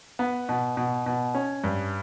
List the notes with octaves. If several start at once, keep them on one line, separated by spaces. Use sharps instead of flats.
B3
B2
B2
B2
C#4
G2